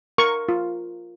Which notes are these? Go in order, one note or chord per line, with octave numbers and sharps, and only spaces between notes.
A#4 C#6
F4